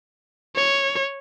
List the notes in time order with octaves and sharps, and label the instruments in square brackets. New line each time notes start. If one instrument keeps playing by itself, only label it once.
[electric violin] C#5